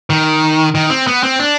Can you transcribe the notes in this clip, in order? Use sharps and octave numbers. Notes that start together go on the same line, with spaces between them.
D#3
D#3
C4
B3
C4
D4